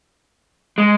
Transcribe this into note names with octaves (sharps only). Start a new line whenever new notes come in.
G#3